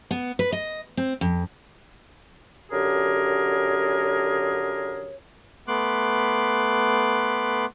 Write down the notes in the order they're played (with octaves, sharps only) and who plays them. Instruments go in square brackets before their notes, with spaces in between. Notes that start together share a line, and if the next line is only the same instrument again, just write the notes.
[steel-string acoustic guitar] B3
B4
D#5
C4
F2
[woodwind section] F#2 D3 G4 G#4 A#4 C#5
[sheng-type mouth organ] A3 B3 C6 D6 F#6